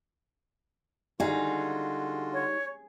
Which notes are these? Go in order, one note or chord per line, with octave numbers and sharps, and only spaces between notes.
D3 G3 D#4 F4 F#4 G#4
C#5